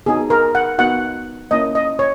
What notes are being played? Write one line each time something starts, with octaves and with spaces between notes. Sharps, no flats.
B3 D#4 F#4 G#4
A#4
F#5
B3 D#4 F#4 F#5
A#3 C#4 E4 D#5
D#5
C#5